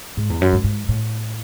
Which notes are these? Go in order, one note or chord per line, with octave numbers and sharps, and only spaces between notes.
G#2
E2
F#2
G#2
G#2
A2